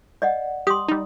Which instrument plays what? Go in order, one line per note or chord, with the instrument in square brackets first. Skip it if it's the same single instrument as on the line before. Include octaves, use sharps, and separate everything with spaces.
[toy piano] D5 D#5 F#5
[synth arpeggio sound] G4 [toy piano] C6 D#6
[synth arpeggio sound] G3 D#4